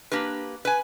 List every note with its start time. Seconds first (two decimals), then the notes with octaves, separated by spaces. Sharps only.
0.12 A#3 D4 G4 B4
0.65 B4 G#5